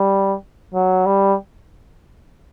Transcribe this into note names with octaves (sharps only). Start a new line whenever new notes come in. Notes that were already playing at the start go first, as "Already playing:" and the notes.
Already playing: G3
F#3
G3